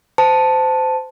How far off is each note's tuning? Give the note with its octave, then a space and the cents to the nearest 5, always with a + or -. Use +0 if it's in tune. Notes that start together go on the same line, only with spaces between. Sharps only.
C5 -25 A5 +0